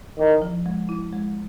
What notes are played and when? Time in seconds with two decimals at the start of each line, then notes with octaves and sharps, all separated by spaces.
0.19 D#3 E4
0.42 F3
0.66 G#3
0.89 E4
1.12 G#3